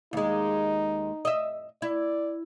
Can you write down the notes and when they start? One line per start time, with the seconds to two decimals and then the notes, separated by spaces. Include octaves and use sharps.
0.13 D#2 G#3 D#4
1.25 D#5 E5
1.82 E4 D5